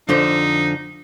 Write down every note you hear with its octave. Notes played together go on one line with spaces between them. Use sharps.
F2 D3 D#4 C5